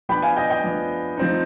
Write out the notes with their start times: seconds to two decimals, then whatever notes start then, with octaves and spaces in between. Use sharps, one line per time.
0.09 F3 B3 D4 G5 B5
0.22 F5 G#5
0.36 D#5 G5
0.50 D#5 G5
0.63 F3 B3 D4
1.17 F3 C4 D#4